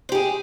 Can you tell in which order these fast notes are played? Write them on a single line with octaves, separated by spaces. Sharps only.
C5 G4 G#4